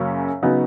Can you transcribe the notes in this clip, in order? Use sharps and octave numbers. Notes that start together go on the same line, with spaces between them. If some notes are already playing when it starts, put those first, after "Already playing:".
Already playing: F#2 C#3 F#3 A#3 C#4
C#3 F#3 B3 D#4